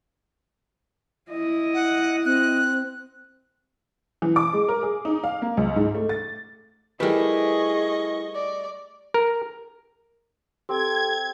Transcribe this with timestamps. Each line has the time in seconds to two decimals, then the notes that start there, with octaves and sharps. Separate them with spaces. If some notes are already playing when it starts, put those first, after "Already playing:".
1.31 E4 D#5
1.74 F#5
2.25 C4 F#6
4.22 E3
4.36 D6
4.53 G#3
4.68 A#4
4.83 G#4
5.05 D#4
5.24 F5
5.42 A#3
5.57 C#2
5.76 G#2
5.95 A3
6.09 A6
7.00 G3 A3 E4 G#4 A#4 B4 D#5 C#6
8.35 D5
9.14 A#4
10.69 C4 G4 A4 G#6